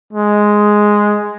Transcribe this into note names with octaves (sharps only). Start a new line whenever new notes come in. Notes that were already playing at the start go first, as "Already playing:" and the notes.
G#3